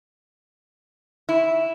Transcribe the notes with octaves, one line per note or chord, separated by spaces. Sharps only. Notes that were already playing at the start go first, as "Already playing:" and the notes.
E4